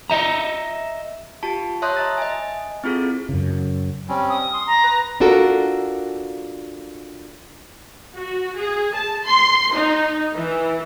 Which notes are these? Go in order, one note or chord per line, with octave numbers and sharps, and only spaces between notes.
D#5 E5 A#5
F4 G4 A5
C#5 E5 A5 C6 D#6 F#6
D#5 E5 A#5 A6
D#5 G#5
C4 E4 F4 G#4 A4
F#2 C#3
G3 C4 C#4
D#6
C6
A#5
B4
D4 F4 F#4 A4 A#4
F#4
G#4
A5
C6
D#4
E3